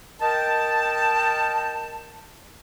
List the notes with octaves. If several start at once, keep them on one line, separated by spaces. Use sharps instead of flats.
A#4 D#5 G5 A5